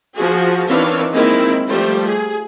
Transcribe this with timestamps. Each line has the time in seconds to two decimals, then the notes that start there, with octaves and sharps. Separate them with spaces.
0.16 F3 F#4 G#4
0.66 D#3 E3 C4 D4 C#5 F5
1.13 D#3 G#3 A#3 C4 D#4 E4
1.68 F3 G3 A3 C5
2.05 G#4